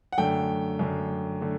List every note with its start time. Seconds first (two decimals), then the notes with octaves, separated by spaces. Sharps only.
0.13 F#5
0.18 F#2 D3 A3 G5
0.79 F#2 D3 A3
1.41 D3 A3